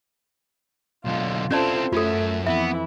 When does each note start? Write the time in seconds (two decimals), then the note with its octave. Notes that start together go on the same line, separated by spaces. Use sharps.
1.05 B1 D3 F4
1.51 C4 C#4 E4 F4 A4 C5 D5 A5
1.93 F#2 A3 C#4 F4 A4 E5
2.47 F2 E3 B3 E4 E5